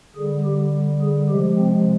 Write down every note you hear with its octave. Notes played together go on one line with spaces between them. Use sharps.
D3 G3 G#4
G4
G#4
C3 F3 G#3 G4
C4